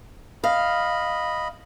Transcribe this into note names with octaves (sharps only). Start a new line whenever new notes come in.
D#5 F5 B5